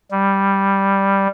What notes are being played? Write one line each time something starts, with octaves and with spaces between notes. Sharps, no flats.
G3